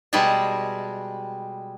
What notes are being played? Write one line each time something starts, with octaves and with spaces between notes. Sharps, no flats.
B2 G3 G#3 G#4 E5 A5